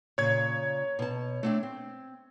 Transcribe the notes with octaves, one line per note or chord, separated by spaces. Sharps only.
A#2 C#3 C#5 G#6
B2 A5
A3 C4 D4
C4